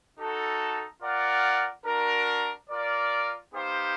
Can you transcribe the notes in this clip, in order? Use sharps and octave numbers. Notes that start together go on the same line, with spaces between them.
D#4 F#4 A4
F4 A#4 D5 F#5
D4 F#4 A#4
F4 A#4 D5
B3 D#4 G4 C5 F5